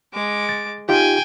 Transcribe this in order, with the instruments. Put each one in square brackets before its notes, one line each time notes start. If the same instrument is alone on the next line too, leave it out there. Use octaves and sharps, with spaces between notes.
[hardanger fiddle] G#3 D6
[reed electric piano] A6
[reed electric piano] D#4 F4 G4 [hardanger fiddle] G5 G#5